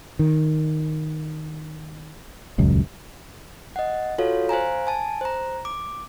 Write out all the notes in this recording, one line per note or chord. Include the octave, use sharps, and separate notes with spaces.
D#3
D#1 C#2 F#2
D#5 F#5
F4 F#4 A4 C#5 F5
C5 F5 G#5 A#5
G#5 A5
C5 A#5
D6